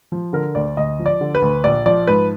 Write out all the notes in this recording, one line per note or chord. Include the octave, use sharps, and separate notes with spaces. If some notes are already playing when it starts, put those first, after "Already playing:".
F3
D3 A#4
D2 D5
D2 D#5
F3
D5
D3
B4
D2
A#1 D5
F3 D5
G#2 B4